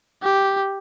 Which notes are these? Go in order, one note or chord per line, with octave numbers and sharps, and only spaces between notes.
G4